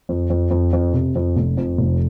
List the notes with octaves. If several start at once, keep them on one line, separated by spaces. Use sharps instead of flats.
F2
F2
F2
F2
C3
F2
F1
F2
F1